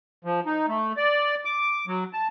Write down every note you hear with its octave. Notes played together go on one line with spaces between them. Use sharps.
F3
D#4
A3
D5
D6
F#3
A5